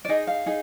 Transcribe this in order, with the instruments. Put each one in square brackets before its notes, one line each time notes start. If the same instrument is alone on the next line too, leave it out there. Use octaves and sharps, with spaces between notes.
[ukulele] D5
D#4 G#4 D#5
F5
D#4 G#4